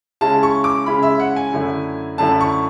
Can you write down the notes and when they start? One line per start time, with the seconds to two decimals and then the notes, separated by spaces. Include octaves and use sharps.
0.21 C#3 G#3 C#4 E4 A5
0.43 C#6
0.64 D6
0.86 C#3 G#3 C#4 E4 B5
1.03 E5
1.19 F#5
1.36 G#5
1.53 F#2 D3 A3 E4
2.18 F#2 D3 A3 E4 A5
2.40 C#6